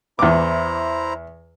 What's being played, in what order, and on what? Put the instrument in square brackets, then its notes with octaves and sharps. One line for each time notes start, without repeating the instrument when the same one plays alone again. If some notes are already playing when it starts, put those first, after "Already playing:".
[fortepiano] E2 D6 [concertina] E4 C5 A#5